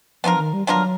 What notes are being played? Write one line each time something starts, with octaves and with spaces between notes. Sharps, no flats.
F3 B3 D4 F4 A#4
D#3
G3
F#3 B3 D4 F4 A#4